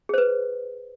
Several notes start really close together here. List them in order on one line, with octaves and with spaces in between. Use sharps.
G#4 C5 B4